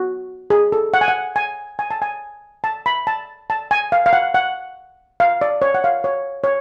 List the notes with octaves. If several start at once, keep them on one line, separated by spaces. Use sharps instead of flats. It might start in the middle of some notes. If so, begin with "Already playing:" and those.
Already playing: F#4
G#4
A4
F#5
G#5
F#5
G#5
G#5
A5
G#5
A5
B5
A5
A5
G#5
F5
F5
F#5
F#5
F5
D5
C#5
F#5
F5
C#5
C#5